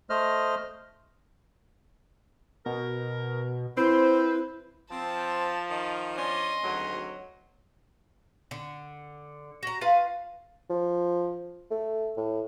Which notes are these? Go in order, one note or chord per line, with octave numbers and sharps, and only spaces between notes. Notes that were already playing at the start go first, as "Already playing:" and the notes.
A3 C5 D#5 F6
B2 A#4
C4 E4 B4 C5
F3 C4 A5
D#3 D#5
C#4 D4 D5 D#5 C6
G#1 D2 F#3
D3
F#4 A#5
F4 B4 F5
F3
A3
A2